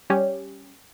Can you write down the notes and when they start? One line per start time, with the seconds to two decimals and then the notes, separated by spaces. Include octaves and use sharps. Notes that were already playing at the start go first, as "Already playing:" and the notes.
0.10 G3 C#4 G4